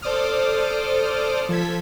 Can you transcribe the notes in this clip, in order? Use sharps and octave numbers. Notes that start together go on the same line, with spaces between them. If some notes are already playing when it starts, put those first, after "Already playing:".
A4 C5 D5 D6 D#6 F6
F3 A4 G#6 B6